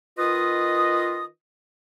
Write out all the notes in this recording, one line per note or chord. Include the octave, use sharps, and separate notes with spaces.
D#3 F4 B4 D#5 D#6